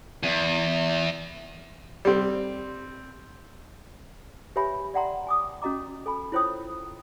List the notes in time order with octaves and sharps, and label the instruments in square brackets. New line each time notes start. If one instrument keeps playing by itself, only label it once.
[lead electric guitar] E2
[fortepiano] G3 C4
[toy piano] G4 B4 C#5 E5 G#5 B5
D5 E5 F#5 G5 A#5 C6
G#5 D6 D#6
C#4 F#4 D#5 A#5 D6
A4 G#5 B5
E4 F4 C5 C#5 G5 D#6